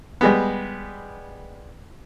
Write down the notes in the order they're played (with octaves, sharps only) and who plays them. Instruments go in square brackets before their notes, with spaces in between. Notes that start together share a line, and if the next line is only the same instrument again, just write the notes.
[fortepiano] G3 G#3 B3